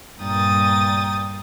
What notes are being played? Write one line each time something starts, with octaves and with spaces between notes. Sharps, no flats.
G2 A#2 A#4 G5 D#6 A6